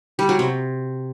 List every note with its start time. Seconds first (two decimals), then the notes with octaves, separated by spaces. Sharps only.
0.19 G3
0.29 F#3
0.39 C3